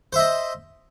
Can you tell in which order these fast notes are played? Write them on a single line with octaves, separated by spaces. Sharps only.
C5 E5 D#5